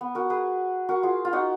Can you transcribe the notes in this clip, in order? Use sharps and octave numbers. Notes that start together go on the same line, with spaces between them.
B3
F#4 A#4
G#4 B4
F#4 A#4
F4 G#4
F4
D#4 F#4